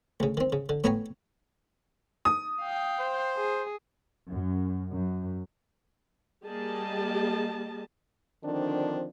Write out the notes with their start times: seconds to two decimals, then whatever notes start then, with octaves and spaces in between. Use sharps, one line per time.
0.20 D2 C#3
0.37 D#3 C4
0.52 C#3
0.69 D3
0.84 A2 B3 C#5 G5 G#5 A#5
2.25 D#6
2.62 F5 G5
2.99 C5
3.37 G#4
4.29 F#2
4.91 F#2
6.45 G3 A#3 G4 G#4 D#5 A5
8.44 D3 D#3 F3 C4 D4